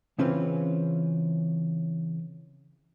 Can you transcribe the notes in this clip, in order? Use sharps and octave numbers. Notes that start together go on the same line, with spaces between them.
C#3 E3 C4 C#4 F4 B4